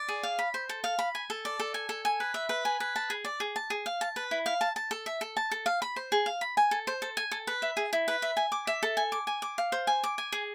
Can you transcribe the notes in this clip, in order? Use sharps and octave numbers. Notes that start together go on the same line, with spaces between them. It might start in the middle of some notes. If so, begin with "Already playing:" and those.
Already playing: D5
G#4
F5
B5
C5
A4
F5
B5
G#5
A4
D5
A4
G#5
A4
G#5
B4
E5
B4
G#5
B4
A5
G#4
D5
G#4
A5
G#4
F5
A5
B4
E4
F5
A5
A5
A4
E5
A4
A5
A4
F5
B5
C5
G#4
F5
B5
G#5
A4
C5
A4
G#5
A4
B4
E5
G#4
E4
B4
E5
G#5
D6
E5
A4
G#5
D6
G#5
D6
F5
C5
G#5
D6
G#5
G#4